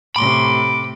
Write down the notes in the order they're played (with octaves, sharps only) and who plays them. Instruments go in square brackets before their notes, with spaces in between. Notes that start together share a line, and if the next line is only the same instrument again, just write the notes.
[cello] A2 C3 [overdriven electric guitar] B5 C6 [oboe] D6